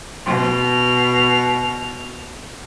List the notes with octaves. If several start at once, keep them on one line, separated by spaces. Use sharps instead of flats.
B2 F6